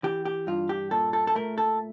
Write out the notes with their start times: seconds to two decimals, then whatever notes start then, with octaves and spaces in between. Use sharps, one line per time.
0.03 E3 G4
0.25 G4
0.47 G2 F4
0.69 G4
0.91 A#2 A4
1.13 A4
1.27 A4
1.35 A3 A#4
1.58 A4